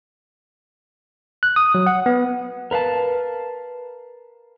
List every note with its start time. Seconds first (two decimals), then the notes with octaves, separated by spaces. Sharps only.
1.43 F#6
1.56 D#6
1.75 F#3
1.86 F#5
2.06 B3
2.71 A#4 B4 F5 A5